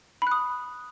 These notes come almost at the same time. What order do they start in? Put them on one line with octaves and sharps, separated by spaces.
B5 F#6 D#6